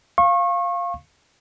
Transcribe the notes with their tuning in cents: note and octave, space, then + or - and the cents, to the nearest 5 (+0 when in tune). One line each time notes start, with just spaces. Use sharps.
F5 +0 C#6 -30